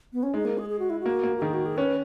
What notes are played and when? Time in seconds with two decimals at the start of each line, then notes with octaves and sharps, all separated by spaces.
0.13 B3
0.23 C#4
0.34 G#3 D#4
0.45 A#3
0.58 G#4
0.69 G#4
0.79 F#4
0.90 E4
1.00 F#4
1.06 A#3
1.23 A#3
1.37 F#4
1.41 D#3 G#4
1.53 F#4
1.65 G#4
1.76 C#4 B4